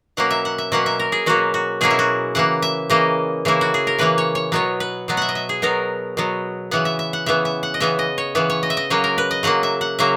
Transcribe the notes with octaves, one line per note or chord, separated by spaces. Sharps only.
B2 F#3 A#3 C#4 F#5
E5
F#5
E5
B2 F#3 A#3 C#4 F#5
E5
A#4
G#4
B2 F#3 A#3 C#4 F#4
F#4
B2 F#3 A#3 C#4 G#4
E4
F#4
C#3 E3 A#3 F#5
E5
C#3 E3 A#3 D#5
C#3 E3 A#3 E4
F#4
G#4
A#4
C#3 E3 A#3 B4
C#5
C#5
B2 F#3 B3 C#5
B4
B2 F#3 B3
E5 F#5
D#5
E5
G#4
B2 F#3 B3 A#4
B2 F#3 B3
C#3 E3 B3 F#5
E5
E5
F#5
C#3 E3 B3 E5
E5
F#5
D#5
C#3 E3 B3 E5
D#5
C#5
C#3 E3 B3 B4
C#5
D#5
E5
D#5
C#3 F#3 A#3 C#5
A#4
B4
D#5
C#3 F#3 A#3 F#5
E5
F#5
C#3 F#3 A#3 E5